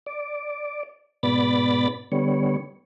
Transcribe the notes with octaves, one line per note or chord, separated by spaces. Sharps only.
D5
G#2 B2 B3 D5 B5 A6
D3 G3 B3 C#5